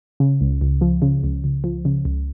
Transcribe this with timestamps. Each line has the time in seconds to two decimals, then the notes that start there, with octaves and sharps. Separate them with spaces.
0.20 C#3
0.41 C#2
0.61 C#2
0.81 F3
1.02 C#3
1.24 C#2
1.44 C#2
1.64 F3
1.85 C#3
2.05 C#2